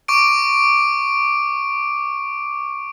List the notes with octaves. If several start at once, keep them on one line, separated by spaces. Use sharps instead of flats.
C#6 D6 D7